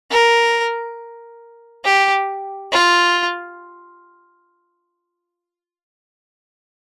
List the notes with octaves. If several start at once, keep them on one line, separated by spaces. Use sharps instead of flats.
A#4
G4
F4